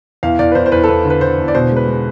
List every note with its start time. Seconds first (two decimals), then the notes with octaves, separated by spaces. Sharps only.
0.23 E2 F5
0.39 E2 D5
0.52 B4
0.55 E2 C5
0.66 C5
0.72 E2 B4
0.84 A4
0.88 E2 B4
1.05 D3
1.10 B4
1.21 D3 C5
1.38 E2
1.48 D5
1.55 B2 C5
1.71 G#3
1.76 B4
1.87 G#3